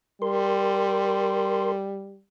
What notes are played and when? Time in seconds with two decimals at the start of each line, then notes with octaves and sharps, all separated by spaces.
0.22 G3 A#4 C6